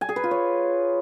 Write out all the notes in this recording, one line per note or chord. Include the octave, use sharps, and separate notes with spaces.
G#5
G#4
B4
F4
C#5